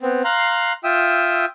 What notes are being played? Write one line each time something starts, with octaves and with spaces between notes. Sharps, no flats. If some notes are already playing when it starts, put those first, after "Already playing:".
B3 C4
F5 A#5 C6 F#6
F4 E5 G5 D#6 E6